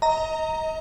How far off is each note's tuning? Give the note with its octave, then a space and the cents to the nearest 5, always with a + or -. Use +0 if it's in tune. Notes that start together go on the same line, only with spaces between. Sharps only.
D#5 +30 A#5 -15